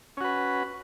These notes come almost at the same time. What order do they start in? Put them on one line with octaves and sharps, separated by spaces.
C#4 F#4 B4